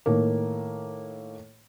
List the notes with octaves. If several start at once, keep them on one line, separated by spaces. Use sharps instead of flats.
A2 D#3 A#3